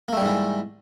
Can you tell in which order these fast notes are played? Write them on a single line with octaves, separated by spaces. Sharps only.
A#3 A3 G3 G#2 E3